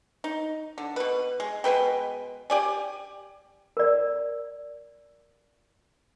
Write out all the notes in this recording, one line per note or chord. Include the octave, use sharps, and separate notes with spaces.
D#4
D3
B2 B4
G#3
B2 G#3 B4 G5
G4 D5 G#5
A#4 D5